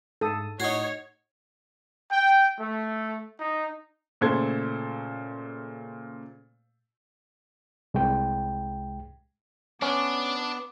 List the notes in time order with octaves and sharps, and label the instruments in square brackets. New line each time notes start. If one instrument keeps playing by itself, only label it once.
[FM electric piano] G#2 D#6 [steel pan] A4
[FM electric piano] A2 C7 [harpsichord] D#4 F#4 [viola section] C#5
[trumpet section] G5
A3
D#4
[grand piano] A#2 C#3 A3 A4 C5 G#6
[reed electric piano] C2 G#3 G5
[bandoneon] B3 [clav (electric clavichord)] C#4 [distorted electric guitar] D4 [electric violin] D6